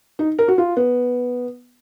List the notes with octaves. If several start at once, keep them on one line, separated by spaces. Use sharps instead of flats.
D#4
A#4
F#4
F4
B3